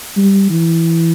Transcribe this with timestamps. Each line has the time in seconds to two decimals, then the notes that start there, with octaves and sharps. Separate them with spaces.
0.17 G3
0.50 E3